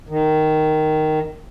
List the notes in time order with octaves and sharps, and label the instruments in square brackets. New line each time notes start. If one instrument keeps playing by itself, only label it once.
[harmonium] D#3